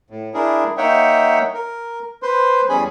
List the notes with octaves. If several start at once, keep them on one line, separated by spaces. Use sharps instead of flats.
A2
D4 E4 G#4 A#4
A#3 D#4 C#5 E5 F#5 G5
A#4
B4 C5 C6
E2 G3 C#4 G#4 G#5 B5